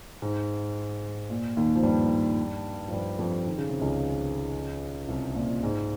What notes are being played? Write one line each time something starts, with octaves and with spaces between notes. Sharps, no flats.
G#2
A#2
D#2 D#3
F3
G2 G3
F3
G2 G3
F2 F3
D#3
C#3
C3
C#2 C#3
C2 C3
A#2
G#2